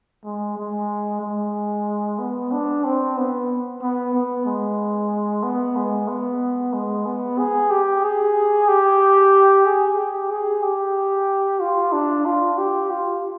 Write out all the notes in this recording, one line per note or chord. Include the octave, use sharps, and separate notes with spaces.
G#3
G#3
G#3
B3
D4
C4
B3
B3
B3
G#3
B3
G#3
B3
G#3
B3
G#4
G4
G#4
G4
G#4
G4
G#4
G4
F4
D4
F4
G4
F4